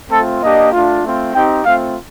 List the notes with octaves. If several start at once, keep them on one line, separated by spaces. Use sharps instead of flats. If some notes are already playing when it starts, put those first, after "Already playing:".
A3 C4 F4 A4
A#3 D4 G4 D#5
A3 D4 F4
A3 C4 F4
C4 D#4 G4 G5
A3 C4 F4 F5